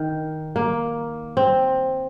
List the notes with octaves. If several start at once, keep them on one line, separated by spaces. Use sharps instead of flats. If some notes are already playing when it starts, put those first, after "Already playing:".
Already playing: D#3
A#3
C4